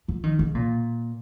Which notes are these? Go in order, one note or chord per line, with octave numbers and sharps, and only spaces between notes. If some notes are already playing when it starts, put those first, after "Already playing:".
F3
D#3
C#3
A#2